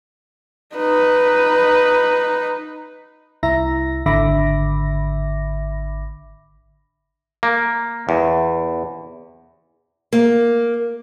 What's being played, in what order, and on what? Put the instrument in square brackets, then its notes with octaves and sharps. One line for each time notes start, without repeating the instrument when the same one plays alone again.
[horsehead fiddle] D#4 B4
[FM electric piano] C2 E4 E5 A#5 A#6
G#1 D3 E5 B5 D6 A#6
[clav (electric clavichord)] A#3
E2
[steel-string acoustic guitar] A#3